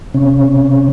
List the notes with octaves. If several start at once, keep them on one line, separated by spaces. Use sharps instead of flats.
C3 C#4